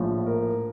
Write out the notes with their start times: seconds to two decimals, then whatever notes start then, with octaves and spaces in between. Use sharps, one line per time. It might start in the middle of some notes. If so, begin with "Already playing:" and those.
Already playing: A#1 A2 F3
0.26 A#4